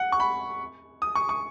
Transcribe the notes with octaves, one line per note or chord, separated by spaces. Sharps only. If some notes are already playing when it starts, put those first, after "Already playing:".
Already playing: F#5
C#6
B5
D#6
C#6
C#6